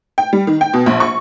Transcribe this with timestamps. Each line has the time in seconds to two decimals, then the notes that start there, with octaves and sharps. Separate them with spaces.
0.18 G5
0.33 G3
0.47 D#3
0.61 G5
0.74 B2
0.86 A#1
1.00 C#6